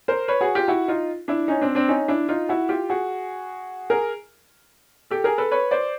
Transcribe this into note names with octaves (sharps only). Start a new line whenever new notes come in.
A#4 C5
B4 C#5
F#4 G#4
F4 G4
E4 F#4
D#4 F4
D4 E4
C#4 D#4
C4 D4
C4 D4
C#4 D#4
D4 E4
D#4 F4
E4 F#4
F4 G4
F#4 G#4
G#4 A#4
G4 A4
G#4 A#4
A4 B4
B4 C#5
C5 D5